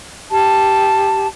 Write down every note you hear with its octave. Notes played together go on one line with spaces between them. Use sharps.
G4 A5